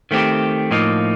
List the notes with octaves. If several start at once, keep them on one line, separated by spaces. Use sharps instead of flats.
D#3 A3 C4 G4
A2 F3 A#3 D#4